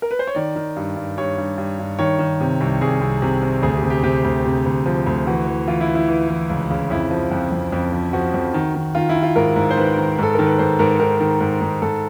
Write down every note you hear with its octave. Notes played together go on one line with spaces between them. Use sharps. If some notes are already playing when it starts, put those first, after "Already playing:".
A#4
B4
C5
C#5
D#3 D5
D#3
G2
G2
G2 C#5
G2
G2
G2
D#3 C#5
D#3
C3
C2
C2 G#4
C2
C3
C3
D2 G#4
G4
C3
G4
C3 G4
D2
C3
D2
F3
D2
E3 F#4
E3
E3 F4
E4
E3
E4
E3
E3
C#2
C#3
F2 E4
F3
F2
F2
F2
F3
F3 F#4
F2
D#3
D#3
D#3 F4
E4
D#3
F4
G#2 A#4
G#2
C5
D#3 B4
D#3
G#2 A4
D#3 A#4
B4
G#2 C5
G#2 A#4
D#3 A#4
D#3
G#2
G#2
G#2 A4